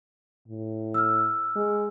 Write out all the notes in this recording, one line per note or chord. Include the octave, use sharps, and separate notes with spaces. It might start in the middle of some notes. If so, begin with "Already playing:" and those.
A2
E6 F6
G#3